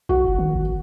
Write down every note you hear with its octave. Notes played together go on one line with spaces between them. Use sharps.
B1 F#4
F#1
D#3
G#1